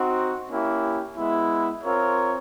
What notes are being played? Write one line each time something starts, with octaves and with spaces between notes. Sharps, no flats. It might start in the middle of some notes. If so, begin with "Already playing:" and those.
Already playing: C4 D#4 F#4
A#3 C#4 E4 G4
G#3 B3 E4
C4 F4 A#4 C#5